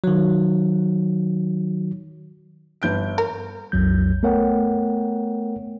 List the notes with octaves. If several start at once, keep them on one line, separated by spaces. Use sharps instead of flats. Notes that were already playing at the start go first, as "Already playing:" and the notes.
D#3 F#3
G1 G6 D7
A#4
B1 F2 F#3 G6
A3 B3 A#4 C#5 F#5 G5